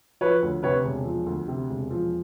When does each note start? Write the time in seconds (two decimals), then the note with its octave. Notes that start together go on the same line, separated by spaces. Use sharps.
0.21 F3 B4 C#5
0.42 D2
0.63 C3 B4 C#5
0.84 E1
1.05 F3
1.26 D2
1.48 C3
1.69 E1
1.90 F3